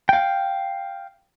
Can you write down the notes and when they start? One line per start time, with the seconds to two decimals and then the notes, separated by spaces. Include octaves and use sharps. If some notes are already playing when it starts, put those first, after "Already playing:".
0.09 F5 G5